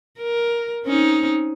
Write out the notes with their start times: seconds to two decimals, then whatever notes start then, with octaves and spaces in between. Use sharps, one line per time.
0.18 A#4
0.84 C4 C#4 D#4